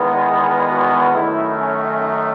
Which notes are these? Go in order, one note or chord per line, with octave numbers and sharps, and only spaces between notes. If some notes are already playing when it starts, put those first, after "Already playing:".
Already playing: E2 D#3 G#3 B3
G#4
F#4
F#2 D#3 A3 E4
C#4
D#4